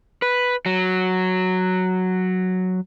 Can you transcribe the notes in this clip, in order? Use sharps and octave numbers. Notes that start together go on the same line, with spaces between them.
B4
F#3